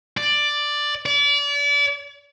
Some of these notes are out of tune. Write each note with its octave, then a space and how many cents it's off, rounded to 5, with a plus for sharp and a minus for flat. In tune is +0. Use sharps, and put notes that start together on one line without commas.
D5 +5
D5 -35